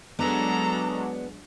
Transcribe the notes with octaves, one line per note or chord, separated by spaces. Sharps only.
F#3 G#3 B3 D4 A4 B4 A#5